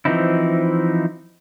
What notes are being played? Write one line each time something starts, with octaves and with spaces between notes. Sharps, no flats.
E3 F3 C4 D#4 E4